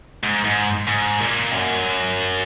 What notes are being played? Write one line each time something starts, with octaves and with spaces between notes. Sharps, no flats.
G#2
G#2
G#2
A#2
F#2